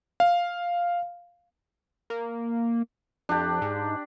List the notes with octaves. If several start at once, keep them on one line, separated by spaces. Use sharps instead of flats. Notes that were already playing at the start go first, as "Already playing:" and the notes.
F5
A#3
F2 D4 G4
G#2